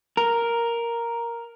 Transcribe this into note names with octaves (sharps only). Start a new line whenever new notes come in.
A#4